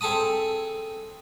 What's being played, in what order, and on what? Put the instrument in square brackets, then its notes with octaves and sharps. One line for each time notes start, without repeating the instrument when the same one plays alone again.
[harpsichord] C4 G#4 A4 A5 B5 D#6